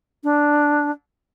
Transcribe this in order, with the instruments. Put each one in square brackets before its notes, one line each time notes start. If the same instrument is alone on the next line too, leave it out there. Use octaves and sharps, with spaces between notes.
[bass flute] D4